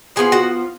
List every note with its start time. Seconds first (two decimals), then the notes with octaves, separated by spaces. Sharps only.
0.16 F3 B3 F4 G#4 G#5
0.32 F#4 F#5